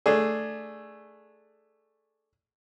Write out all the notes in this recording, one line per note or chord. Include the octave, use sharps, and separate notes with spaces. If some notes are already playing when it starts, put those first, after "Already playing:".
A3 D4 G#4